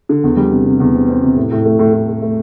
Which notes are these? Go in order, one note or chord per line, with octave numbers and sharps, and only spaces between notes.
D3
E2
G3
C3
C3
E2
C4
C4
C3
A2
A2
A3
A2
A2
A3
A3